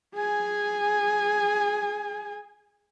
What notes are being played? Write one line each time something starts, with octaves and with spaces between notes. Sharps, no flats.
G#4 G#5